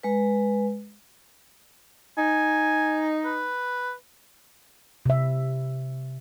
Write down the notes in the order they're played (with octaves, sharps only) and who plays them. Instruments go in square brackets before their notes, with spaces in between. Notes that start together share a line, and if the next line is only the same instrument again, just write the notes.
[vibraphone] G#3 B4
[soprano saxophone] D#4 [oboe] G#5
[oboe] B4
[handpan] C3 E5